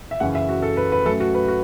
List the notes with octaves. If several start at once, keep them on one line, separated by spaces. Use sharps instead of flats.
E5
F#2 C#3 E3 C#4 F#5
E5
F#4
A4
B4
B4
F#2 F#3 A3 C#4 A4
F#4
B4
F#4